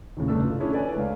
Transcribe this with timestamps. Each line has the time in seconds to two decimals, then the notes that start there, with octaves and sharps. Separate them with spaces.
0.17 D#2 A2 C#3
0.28 G1 C#3 A3 D4 E6
0.44 F4
0.60 C#4 D4 E4 G#4
0.72 A4 B4 C#5 D5 G#5
0.96 C#2 F5